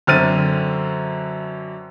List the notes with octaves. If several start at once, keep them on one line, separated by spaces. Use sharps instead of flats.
F#2 D3 C4 F6 A6 D#7